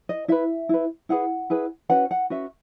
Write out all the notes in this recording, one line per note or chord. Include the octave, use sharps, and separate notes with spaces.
D#5
E4 B4 E5
E4 B4
E4 G#4 B4 F#5
E4 G#4 B4
C#4 F#4 B4 F#5
F#5
C#4 F#4 B4 E5